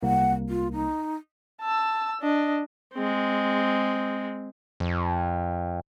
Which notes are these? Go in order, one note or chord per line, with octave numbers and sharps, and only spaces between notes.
C2 A#3 F#5
F4
D#4
A5 E6
D4 D#5
G#3 C4
F2